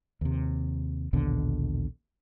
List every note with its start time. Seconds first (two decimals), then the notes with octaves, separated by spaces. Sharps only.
0.21 D#2 C3
1.13 A#1 D#2 B2 D3